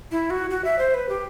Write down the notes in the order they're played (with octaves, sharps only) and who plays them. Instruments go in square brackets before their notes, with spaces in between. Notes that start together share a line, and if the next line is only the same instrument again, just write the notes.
[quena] E4
F#4
F#4
E5
C5
B4
G4